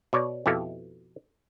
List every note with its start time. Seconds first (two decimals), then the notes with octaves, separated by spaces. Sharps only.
0.13 B2 C#5 D5
0.46 F2 B2 E4 G4 A4 F5